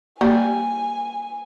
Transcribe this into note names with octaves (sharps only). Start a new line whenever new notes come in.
G3 A#3 G#5